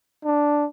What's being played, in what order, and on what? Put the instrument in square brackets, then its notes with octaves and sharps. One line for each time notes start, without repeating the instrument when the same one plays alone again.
[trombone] D4